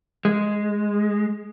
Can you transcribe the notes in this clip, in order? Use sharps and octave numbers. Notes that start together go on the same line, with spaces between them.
G#3